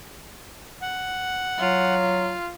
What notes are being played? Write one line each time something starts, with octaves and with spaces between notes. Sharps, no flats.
F#5
F#3 F4